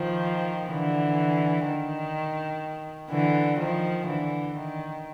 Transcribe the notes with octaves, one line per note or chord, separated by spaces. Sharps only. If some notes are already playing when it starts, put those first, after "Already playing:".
Already playing: D#3 F3
D3 E3
D#3
D3 E3
D#3 F3
D3 E3
D#3